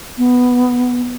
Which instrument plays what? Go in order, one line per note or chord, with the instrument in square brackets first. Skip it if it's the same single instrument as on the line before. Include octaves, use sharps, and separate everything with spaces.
[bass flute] B3